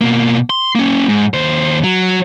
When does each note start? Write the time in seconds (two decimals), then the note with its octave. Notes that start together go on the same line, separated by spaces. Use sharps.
0.01 B2 A#3
0.50 C6
0.75 A#3 C#4
1.09 G#2
1.34 D#2 C5
1.84 F#3